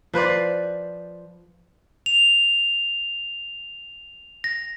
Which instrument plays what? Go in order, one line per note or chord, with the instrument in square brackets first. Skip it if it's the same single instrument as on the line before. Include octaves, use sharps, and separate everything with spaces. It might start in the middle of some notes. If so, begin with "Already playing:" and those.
[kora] F3 B4 C5 D5
[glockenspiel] F7
A#6